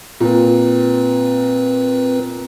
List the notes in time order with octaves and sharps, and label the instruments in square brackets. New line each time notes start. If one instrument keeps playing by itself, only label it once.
[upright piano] A#2 [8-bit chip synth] C4 B4